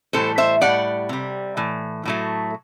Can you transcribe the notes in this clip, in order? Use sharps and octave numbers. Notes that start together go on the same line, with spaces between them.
A2 E3 G3 A4 C5
C5 E5
A2 G3 D5 F#5
C3 G3
A2 E3
A2 F#3 A3